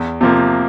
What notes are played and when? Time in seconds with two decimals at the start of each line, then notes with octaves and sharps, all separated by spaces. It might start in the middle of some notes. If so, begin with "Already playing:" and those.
Already playing: E2
0.21 C3 F3 A#3